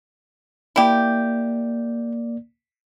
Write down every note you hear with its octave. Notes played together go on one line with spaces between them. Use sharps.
A#3 E4 G4 D5